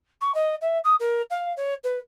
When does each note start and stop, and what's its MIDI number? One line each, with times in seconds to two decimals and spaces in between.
0.21 0.34 85
0.34 0.55 75
0.61 0.79 76
0.84 0.95 87
1.00 1.22 70
1.30 1.53 77
1.57 1.74 73
1.84 1.99 71